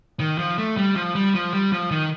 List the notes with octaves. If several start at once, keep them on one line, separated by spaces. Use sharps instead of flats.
D#3
F3
A3
G3
F3
G3
F3
G3
F3
D#3